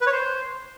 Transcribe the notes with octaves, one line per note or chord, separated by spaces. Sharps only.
B4
C#5
C5